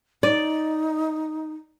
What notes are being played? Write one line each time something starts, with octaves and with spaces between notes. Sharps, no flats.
D#4 D5